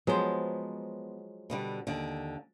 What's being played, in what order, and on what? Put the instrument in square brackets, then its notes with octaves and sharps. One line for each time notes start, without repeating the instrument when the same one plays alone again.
[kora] F3 F#3 G#3 [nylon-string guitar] B3 C5
[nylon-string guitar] B2 D3 G3
D#2 D3